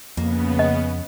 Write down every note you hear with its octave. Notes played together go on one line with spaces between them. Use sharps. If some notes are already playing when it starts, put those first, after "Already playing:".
F2 C#3 A#3 B3
D#5